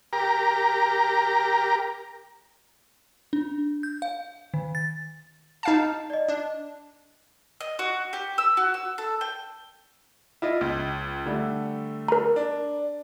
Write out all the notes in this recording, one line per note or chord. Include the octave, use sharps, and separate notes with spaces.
G4 A#4 A#5
D4
G6
F5
D#3
A6
D#4 F5 A5
D5 D#5
D4
D#5
F#4
G4
E6
F#4
E6
A4
G5
E4 F4 D#5
C#2
D3 G3 A3
A#4 A#5
D4